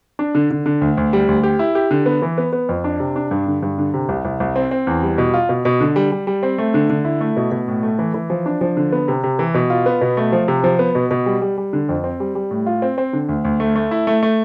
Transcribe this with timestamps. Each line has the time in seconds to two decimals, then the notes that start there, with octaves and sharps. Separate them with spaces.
0.19 D4
0.35 D3
0.51 D3
0.66 D3
0.81 D2
0.97 D2
1.13 G3
1.28 D2
1.43 G4
1.59 E4
1.75 G4
1.91 D3
2.06 B3
2.22 E3
2.38 B3
2.53 B3
2.69 F2
2.84 D4
3.00 C3
3.16 D4
3.31 G2
3.47 D3
3.62 G2
3.78 D3
3.94 C3
4.09 C2
4.25 C2
4.40 C2
4.56 C4
4.71 C4
4.87 E2
5.02 G3
5.18 B2
5.34 F4
5.49 B2
5.65 B2
5.81 D3
5.96 G3
6.12 G3
6.27 G3
6.43 C4
6.58 A3
6.74 D3
6.90 D3
7.05 E4
7.21 A3
7.37 B2
7.51 B2
7.68 A2
7.83 A3
7.99 E3
8.14 E3
8.30 F3
8.46 D4
8.61 F3
8.77 D3
8.92 B3
9.08 C3
9.24 C3
9.39 E3
9.54 B2
9.70 F4
9.86 B3
10.01 B2
10.17 A3
10.32 F3
10.48 C3
10.64 F3
10.79 B3
10.95 B2
11.11 B2
11.26 G3
11.42 G3
11.58 G3
11.73 D3
11.89 F2
12.04 C4
12.20 G3
12.35 G3
12.51 A2
12.66 F4
12.82 C4
12.98 C4
13.13 D3
13.29 D2
13.45 D2
13.60 A3
13.76 A3
13.91 E4
14.07 A3
14.23 A3